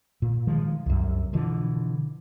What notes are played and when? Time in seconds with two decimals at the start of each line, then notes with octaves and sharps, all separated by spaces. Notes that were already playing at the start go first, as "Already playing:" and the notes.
0.22 A#2
0.47 D#3 F3 G#3
0.86 C2 F#2
1.33 B2 D3 E3 F3